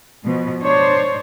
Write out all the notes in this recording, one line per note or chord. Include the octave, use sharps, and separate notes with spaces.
B2 F3
D4 C5 C#5